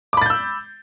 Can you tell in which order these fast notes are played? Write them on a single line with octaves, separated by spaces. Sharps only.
D6 B5 A6 G6 E6